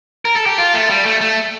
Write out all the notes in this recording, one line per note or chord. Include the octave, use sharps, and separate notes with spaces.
A#4
A4
G4
F4
A3
G3
A3
A3